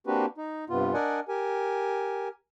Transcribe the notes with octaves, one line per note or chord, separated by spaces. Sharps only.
A#3 C4 D4 F#4 G4 B4
D#4
G2 C3 B3 F4
D4 A#4 D5 D#5 F#5 G#5
G4 A#4 G#5